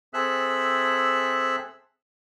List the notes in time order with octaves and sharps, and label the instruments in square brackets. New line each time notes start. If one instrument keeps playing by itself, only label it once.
[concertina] C4 G#4 A4 E5 E6 F#6